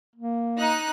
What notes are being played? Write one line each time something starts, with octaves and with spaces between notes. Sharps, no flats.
A#3
D#4 F#6